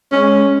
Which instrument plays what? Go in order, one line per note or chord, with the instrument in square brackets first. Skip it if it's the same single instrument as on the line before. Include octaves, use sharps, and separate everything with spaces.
[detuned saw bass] G#3 [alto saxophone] C#4